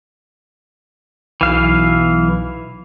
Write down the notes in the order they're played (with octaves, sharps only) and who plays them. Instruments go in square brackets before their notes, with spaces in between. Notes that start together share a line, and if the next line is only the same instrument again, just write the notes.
[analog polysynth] B1 [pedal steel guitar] E3 F5